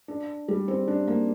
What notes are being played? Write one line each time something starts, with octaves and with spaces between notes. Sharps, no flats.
D4
G3
C4
D4
A#3